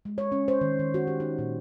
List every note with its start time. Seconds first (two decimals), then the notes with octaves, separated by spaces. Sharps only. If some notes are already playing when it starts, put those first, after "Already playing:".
0.05 G#3
0.18 C#5
0.32 C#4
0.48 C5
0.61 D#3
0.79 D#3
0.94 F#4
1.07 G4
1.20 D#4
1.39 A#2